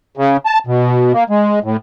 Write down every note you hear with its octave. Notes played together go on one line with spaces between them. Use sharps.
C#3
A5
B2
A#3
G#3
A2